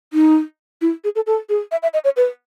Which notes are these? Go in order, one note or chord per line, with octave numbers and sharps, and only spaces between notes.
D#4
E4
G#4
A4
A4
G#4
E5
E5
D#5
C#5
B4